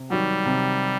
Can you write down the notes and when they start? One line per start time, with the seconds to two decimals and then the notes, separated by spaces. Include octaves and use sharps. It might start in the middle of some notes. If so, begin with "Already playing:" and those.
Already playing: C3
0.10 D#3 F#3 G3
0.46 C3